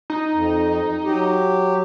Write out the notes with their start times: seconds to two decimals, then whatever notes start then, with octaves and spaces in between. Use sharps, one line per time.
0.10 D#4
0.33 F2
1.04 F#3 G4